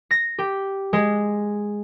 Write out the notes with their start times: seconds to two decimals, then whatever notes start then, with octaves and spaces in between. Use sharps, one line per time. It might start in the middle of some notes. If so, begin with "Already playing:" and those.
0.11 A#6
0.38 G4
0.93 G#3